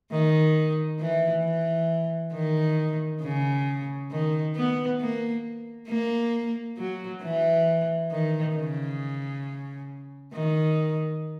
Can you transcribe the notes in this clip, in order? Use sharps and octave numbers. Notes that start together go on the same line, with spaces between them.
D#3
E3
E3
D#3
C#3
D#3
B3
A#3
A#3
F#3
E3
D#3
C#3
D#3